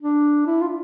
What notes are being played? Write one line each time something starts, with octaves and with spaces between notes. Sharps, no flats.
D4
E4
F4